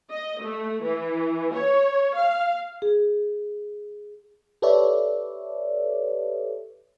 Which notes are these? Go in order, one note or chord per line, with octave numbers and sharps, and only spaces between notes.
D#5
A3
E3
C#5
F5
G#4
G4 A4 B4 C#5 D5 E5